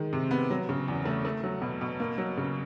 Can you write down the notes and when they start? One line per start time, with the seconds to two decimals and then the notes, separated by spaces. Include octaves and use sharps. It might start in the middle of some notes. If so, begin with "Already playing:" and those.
Already playing: D#3 G#3
0.13 C3
0.31 B3
0.51 F#3
0.69 C#3
0.88 E2
1.05 A3
1.25 A3
1.44 F#3
1.62 B2
1.81 B2
2.00 A#3
2.18 F#3
2.37 C#3